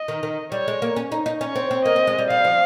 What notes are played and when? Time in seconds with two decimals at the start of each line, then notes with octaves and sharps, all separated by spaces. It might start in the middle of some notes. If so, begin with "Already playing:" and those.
Already playing: D#5
0.08 D#3
0.23 D#3
0.52 G3 C#5
0.68 G#3
0.82 A#3
0.96 C#4
1.12 D#4
1.26 D#4
1.41 C#4 C#5
1.56 C4
1.71 C4
1.85 A#3 D#5
1.96 C4
2.07 G#3
2.19 G3
2.30 G3 F5
2.44 F3